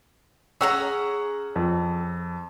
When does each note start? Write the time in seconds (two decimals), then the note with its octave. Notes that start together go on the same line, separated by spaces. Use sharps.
0.61 C#4 G#4 C#5 F#5 A#5 E6
1.56 F2